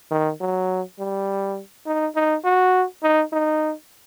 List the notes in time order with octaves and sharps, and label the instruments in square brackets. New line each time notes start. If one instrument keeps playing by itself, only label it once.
[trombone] D#3
F#3
G3
D#4
D#4
F#4
D#4
D#4